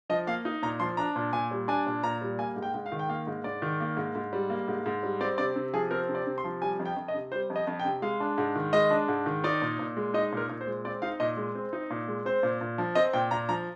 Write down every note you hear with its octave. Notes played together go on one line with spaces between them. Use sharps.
F3 D#5
A#3 F5
D#4
A#2 A#5
F3 C6
D4 A#5
A#2
A#2 G#5
G3
D4 G#5
A#2
A#2 A#5
G3
A#3 G#5
G#2
G5
G#2
F5
D#3
G5
A#3 F5
G#2
G#2 D5
D#3
A#3
G#2
G#2
G3
A#3
G#2
G#2
G3
C4 D5
C3 D5
C3
F3 G#4
C4 A#4
C3
D5
C3
C6
F3
G3 G#5
F2
G5
F2
D#5
C3
G3 C5
F2
D#5
F2
G5
C3
G#3 F5
D4
G#2
D#3
G#3 D#5
D4
G#2
D#3
D#4 D5
A#2
A#2
G#3
D#4 D#5
A#2 A#4
A#2
C5
G#3
C4 D5
D#4 F5
A#2 D#5
G#3
C4
D#4
A#2
G#3
C4 C5
A#2
A#2
F3
C4 D#5
A#2 G5
A#2 A#5
F3 A#5